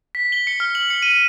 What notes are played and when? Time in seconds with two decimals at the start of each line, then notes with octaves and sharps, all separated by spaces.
0.15 B6
0.32 G7
0.47 C#7
0.60 F6
0.75 F#7
0.90 C#7
1.03 D#7